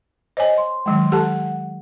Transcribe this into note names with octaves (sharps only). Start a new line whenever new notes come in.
C5 C#5 D#5 G#5
C6
D#3 F#3 G#3
G4 A4 F#5 A5